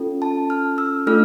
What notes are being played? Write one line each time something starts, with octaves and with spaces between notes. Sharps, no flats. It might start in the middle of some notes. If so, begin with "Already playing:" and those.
Already playing: C#4 F4 A4
A5
F6
E6
A3 D4 F4 A4 F6